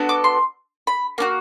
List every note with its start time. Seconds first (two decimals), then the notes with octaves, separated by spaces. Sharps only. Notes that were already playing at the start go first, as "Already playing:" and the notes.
Already playing: B3 D4 F#4 A4
0.09 D6
0.24 C6
0.87 B5
1.18 A#3 D4 F#4